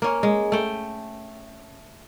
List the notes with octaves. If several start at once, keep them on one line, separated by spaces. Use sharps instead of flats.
A#3 C#4
G#3
A3 G5